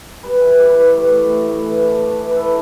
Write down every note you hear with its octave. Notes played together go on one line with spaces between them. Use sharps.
G3 B4
E3
G3 D5
B4
G3 D5
A2 B4
A2
A2
A2
E3
D4
D4
E3
B4
E4 A4